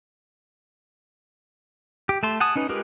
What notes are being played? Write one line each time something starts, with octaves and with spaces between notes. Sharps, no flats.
G4
A3 A5 C6
F#5 G#5 A5 D#6
C#4 D#4 B4
G#3 F4 G4 A#4 B4